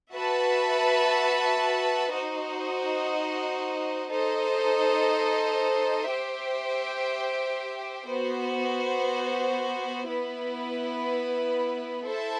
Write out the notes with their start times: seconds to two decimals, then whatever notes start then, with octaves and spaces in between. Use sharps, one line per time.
0.12 F#4 B4 E5 A5
2.11 D#4 F#4 C5 D#5
4.10 D#4 A4 C5 D#5
6.09 G4 C5 E5 G5
8.08 B3 F#4 C5
10.08 B3 E4 B4
12.06 E4 A4 C5 E5 A5